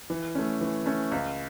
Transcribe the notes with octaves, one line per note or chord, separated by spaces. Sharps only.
E3
A3 C#4
E3
A3 C#4
C#2